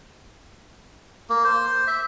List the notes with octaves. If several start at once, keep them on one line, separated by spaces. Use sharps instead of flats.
A#3
C5
E5